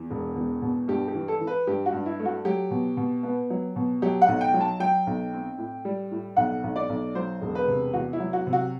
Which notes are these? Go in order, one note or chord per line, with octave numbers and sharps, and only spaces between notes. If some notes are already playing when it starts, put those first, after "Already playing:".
Already playing: E2
E1
E2
B2
G2 G4
G4
E3
A4
E3
B4
G2 G4
F#4
G2
E4
A3
F#4
F#3 G4
B2
B2
B3
F#3
B2
F#3 G4
F#5
B1
G5
F#3
A5
F#3 G5
B1
C4
A2
G3
A2
B1 F#5
B1
D5
B1
F#3 C5
E1
B4
C3
E2 F#4
E4
F#3
F#4
C3
F#4